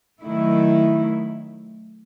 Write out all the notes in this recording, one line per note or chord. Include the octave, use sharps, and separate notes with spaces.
D#3 F#3 A3 E4